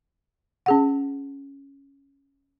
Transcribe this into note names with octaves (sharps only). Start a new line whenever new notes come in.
C#4 G#4 F#5